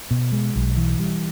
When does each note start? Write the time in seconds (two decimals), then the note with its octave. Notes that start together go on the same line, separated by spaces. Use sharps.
0.11 B2
0.32 G#3
0.56 B1
0.77 E3
0.99 G3